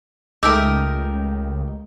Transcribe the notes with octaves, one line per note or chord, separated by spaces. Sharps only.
C#2 G#3 A3 D#4 G4 A#4 D6 E6